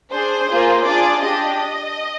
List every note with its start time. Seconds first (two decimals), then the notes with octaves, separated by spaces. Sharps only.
0.11 D4 G#4 C5
0.48 A#3 F4 G#4
0.86 D4 F4 G#4 D5
1.24 D4 G4 D#5